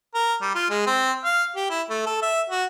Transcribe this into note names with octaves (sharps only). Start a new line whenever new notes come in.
A#4
G3
F4
G#3
C4
F5
G4
E4
A3
A4
E5
F#4